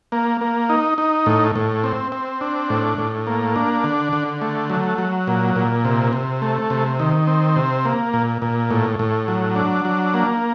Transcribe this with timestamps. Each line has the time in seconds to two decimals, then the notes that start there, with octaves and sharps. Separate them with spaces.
0.12 A#3
0.41 A#3
0.70 D#4
0.98 D#4
1.26 A2
1.56 A2
1.84 C4
2.12 C4
2.41 D4
2.70 A2
2.98 A2
3.27 A#3
3.56 D4
3.84 D3
4.13 D3
4.42 A3
4.70 F#3
4.98 F#3
5.27 A#2
5.56 A#2
5.85 C3
6.13 C3
6.42 A3
6.70 C3
6.99 D#3
7.27 C4
7.56 C3
7.85 A#3
8.13 A#2
8.42 A#2
8.70 A2
8.99 A2
9.28 F#3
9.56 D4
9.85 F#3
10.14 A#3